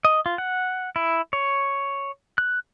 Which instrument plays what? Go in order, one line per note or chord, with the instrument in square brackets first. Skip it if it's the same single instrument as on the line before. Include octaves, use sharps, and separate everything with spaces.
[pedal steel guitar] D#5
F4
F#5
E4
C#5
F#6